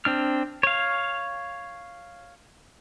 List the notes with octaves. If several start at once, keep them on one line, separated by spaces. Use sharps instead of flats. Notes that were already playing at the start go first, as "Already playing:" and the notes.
C4 D4 F6
C#5 F5